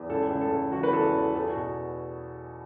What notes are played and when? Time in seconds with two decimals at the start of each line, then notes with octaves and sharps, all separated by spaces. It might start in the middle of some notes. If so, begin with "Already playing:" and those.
Already playing: E2
0.09 C#2 A4
0.30 C#2
0.41 A4
0.51 C#2
0.72 E3 F#4
0.83 B4
0.93 E2 A4
1.14 E2 A4
1.35 E2 A4
1.50 F#4
1.55 B2